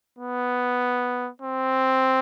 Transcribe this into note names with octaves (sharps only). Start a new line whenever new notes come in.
B3
C4